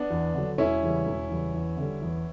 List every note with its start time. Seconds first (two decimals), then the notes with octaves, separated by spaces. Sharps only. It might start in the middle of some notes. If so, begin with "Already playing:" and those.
Already playing: B3 D4
0.10 E2
0.34 D3 F#3
0.58 E1 C#4 E4
0.83 E2 C#3 G3
1.06 E1
1.30 E2 C#3 G3
1.54 E2
1.77 D3 G3
2.02 E2